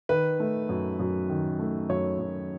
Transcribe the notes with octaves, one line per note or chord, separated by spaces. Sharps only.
D#3 B4
A3
F#2
F#2
D#3
A3
F#2 C#5
F#2